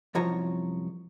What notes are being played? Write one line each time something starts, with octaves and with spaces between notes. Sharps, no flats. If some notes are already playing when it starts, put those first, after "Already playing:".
C2 F#2 F3 C#5 A#5